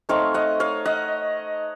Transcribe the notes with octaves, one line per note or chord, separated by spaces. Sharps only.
A3 C4 D#4 C#5 F5
D#5 F#5
C#5 F5
D#5 F#5